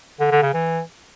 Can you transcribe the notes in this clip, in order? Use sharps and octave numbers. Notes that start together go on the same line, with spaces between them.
D3
D3
C#3
E3